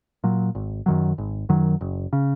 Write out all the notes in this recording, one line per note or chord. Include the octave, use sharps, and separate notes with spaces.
A#2 F#3
G#1
F#2 D#3 F#3
G#1
F#2 D#3 F#3
F#1
C#3